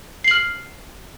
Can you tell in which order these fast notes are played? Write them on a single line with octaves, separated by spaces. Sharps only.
C7 F#7 F6